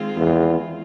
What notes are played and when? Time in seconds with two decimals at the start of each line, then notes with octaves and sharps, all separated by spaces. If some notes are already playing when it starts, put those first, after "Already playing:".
Already playing: D#3 G#3 C4 F4 G#4
0.17 E2